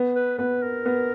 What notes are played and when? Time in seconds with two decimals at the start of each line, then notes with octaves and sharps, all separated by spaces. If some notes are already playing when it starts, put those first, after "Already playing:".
Already playing: B3
0.16 B4
0.38 B3 B4
0.63 A#4
0.86 B3